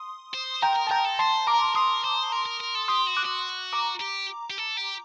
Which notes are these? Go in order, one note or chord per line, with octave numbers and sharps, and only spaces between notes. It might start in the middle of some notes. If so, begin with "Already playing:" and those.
Already playing: C6 D#6
C5
A#4 G5 A#5
A#4
A5
A#4 G5 A#5
A4
C5 A5 C6
A#4 A#5 D6
A#4 C6 D#6
C5
A#4
A#4
A#4
A4
G4 C6 D#6
F#4
D6 F#6
F#4
A#5 D6
G4
G4
A4
G4